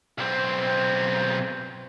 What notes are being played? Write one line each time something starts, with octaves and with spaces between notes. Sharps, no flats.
B1 C4